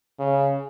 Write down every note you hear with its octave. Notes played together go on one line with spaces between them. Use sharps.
C#3